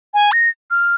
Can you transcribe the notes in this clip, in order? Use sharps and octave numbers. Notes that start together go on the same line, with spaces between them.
G#5
A#6
F6